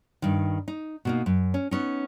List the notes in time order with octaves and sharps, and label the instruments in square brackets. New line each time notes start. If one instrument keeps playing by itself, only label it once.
[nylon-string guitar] G2 D#3
D#4
B2 A#3 D#4
F#2
C#4
B3 C#4 D#4